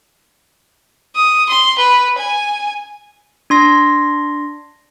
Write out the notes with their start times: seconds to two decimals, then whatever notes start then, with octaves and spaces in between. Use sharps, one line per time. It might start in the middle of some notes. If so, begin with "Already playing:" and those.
1.15 D#6
1.49 C6
1.78 B4
2.18 G#5
3.50 D4 C6 A#6